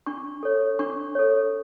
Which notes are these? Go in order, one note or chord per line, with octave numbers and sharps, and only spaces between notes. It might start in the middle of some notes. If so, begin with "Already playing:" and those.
D4 C#6
A4 C#5
D4 C#6
A4 C#5